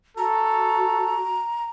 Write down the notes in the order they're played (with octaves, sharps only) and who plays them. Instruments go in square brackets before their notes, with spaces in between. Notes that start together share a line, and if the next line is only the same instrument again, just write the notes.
[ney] F#4 [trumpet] A4 [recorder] A#5